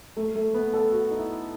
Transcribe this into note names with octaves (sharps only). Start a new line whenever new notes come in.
A3
A3
B3
A4
F#4
D#4
E4